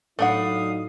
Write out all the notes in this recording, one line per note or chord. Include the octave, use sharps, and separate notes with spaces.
A2 F#3 A3 D4 D#4 F5 F#5 D#6